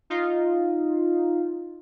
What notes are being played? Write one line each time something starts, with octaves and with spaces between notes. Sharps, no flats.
D#4 F4